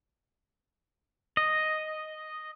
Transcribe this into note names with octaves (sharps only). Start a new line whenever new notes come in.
D#5